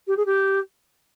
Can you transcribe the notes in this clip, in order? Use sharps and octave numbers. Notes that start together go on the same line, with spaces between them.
G4
G#4
G4